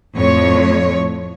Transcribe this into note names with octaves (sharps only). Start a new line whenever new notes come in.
F2 A2 C#5